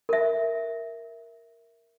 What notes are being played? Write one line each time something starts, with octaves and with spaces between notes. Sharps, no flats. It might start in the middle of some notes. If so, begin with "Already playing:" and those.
A#4 E5